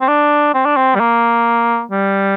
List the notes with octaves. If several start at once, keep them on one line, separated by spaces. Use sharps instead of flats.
C4
D4
C4
D4
C4
G3
A#3
G3